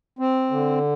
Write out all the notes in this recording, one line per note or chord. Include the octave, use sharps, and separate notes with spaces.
C4
D3